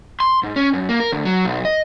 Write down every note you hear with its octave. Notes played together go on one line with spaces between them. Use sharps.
C6
G#2
C#4
F#2
A#3
A#4
D2
F#3
B1
D#5